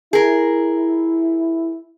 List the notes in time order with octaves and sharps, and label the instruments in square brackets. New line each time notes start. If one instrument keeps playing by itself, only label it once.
[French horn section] E4 [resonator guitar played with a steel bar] G#4 A#4